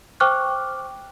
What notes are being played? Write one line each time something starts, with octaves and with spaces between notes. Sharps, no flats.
C5 G5 C#6 D6 F6 F#6